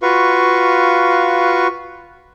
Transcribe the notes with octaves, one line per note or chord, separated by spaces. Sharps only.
F4 F#4 B4 F5 C#6